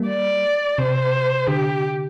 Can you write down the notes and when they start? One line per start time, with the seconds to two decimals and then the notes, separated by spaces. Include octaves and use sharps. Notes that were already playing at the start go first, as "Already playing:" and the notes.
Already playing: G3 A#3
0.08 D5
0.78 C3 C5
1.48 D3 G4